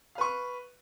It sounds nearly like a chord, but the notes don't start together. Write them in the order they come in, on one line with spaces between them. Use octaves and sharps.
F5 B4 C#6